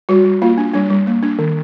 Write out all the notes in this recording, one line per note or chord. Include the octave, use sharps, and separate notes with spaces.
G3 F#4
G3
A#3 F4
D4
G3 D4
G3
A#3
D4
D#3